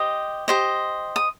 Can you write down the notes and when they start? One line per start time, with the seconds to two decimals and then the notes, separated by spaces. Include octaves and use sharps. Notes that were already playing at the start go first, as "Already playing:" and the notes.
Already playing: G4 C5 D#5 D#6
0.48 G4 C5 D#5
1.16 D#6